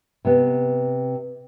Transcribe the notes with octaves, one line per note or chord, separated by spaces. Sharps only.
C3 B3